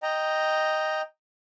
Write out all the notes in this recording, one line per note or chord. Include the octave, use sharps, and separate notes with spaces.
D#5 G5 A#5